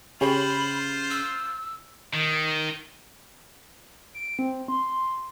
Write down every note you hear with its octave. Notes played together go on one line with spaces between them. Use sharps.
C#3 F4 G4 G#4 C5 C#5 B5
E6
D#3
D7
C4
C6